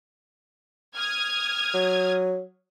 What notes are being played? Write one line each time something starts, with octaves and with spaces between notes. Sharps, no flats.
D#6 F6 G#6
F#3